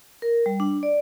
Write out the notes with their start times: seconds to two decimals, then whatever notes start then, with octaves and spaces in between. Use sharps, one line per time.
0.22 A#4
0.46 G3
0.60 D4
0.83 D5